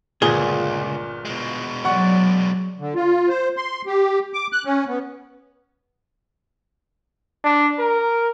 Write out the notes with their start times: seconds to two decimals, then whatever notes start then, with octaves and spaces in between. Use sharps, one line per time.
0.22 G1 C#2 A#2 G#4 G7
1.25 B2 G#3
1.85 F#3 D5 F#5 C#6
2.79 D3
2.95 F4
3.29 C5
3.57 C6
3.86 G4
4.33 D6
4.53 F#6
4.65 C#4
4.88 B3
7.44 D4
7.79 A#4